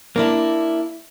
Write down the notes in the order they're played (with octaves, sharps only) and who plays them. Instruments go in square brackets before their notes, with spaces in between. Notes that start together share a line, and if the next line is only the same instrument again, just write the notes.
[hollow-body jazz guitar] A#3 D4 E4